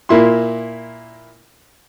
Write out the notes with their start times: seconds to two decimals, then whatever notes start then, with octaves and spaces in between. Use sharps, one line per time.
0.09 A#2 A#3 E4 C6